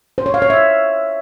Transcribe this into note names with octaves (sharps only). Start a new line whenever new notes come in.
C5
C#5
F5
C#5
E5